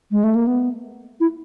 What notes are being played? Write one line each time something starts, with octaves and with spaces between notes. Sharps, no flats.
G#3
A3
A#3
B3
E4